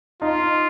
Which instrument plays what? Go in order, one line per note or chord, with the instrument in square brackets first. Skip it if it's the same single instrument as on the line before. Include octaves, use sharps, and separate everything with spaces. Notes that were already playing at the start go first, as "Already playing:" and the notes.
[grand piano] D#4 [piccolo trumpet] F4